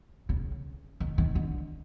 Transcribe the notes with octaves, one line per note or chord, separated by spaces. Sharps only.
C#3
D#3
D#3
D3